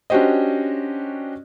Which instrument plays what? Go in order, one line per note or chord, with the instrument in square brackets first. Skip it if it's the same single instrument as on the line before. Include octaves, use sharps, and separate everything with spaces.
[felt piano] C#4 D4 F#4 G4 C5 D#5